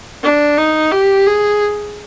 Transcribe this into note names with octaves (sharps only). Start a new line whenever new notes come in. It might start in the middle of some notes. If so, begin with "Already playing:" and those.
D4
D#4
G4
G#4